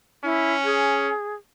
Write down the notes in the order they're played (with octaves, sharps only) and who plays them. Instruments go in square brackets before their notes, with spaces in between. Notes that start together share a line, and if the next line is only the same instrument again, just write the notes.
[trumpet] C#4 [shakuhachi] E4
[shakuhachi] G#4